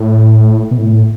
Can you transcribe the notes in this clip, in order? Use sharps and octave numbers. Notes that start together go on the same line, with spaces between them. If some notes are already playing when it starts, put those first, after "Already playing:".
Already playing: A2
B2
A2